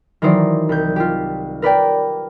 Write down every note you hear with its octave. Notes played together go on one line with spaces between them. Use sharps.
D#3 E3 F#3 D#4 C5 D5
C2 G6
F4 G4
A#4 B4 D5 G5